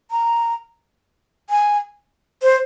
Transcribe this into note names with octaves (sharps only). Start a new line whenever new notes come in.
A#5
G#5
C5